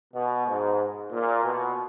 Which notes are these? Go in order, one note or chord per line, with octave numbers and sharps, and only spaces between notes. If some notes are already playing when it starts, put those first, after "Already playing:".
B2
G#2
A#2
B2